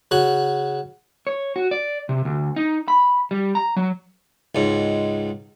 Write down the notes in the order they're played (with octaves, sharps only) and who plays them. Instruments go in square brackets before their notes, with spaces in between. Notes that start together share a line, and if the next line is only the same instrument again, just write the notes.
[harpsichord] C#3 F#4 F#5
[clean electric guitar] C#5
F#4
D5
C3
D2
D#4
B5
G3
A#5
F#3
[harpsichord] C#2 G#2